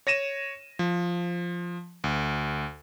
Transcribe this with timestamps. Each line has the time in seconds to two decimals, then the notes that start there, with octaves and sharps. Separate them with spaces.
0.07 C#5 A#6 D#7 E7
0.79 F3
2.04 D2